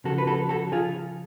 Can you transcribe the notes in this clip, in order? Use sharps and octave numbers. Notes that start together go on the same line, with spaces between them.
C#3 F3 F#4 A4
B4
F#4 A4
F#4 A4
F4 G#4